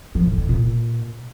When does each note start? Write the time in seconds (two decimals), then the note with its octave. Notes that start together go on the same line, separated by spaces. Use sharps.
0.15 F3
0.26 A2
0.38 D3
0.49 A#2